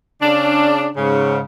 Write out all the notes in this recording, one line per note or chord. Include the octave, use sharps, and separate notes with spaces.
C#3 D4
G#2 C#3